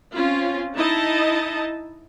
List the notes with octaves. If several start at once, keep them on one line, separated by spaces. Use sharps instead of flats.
C4 C#4 F4
D#4 E4 D#5 A5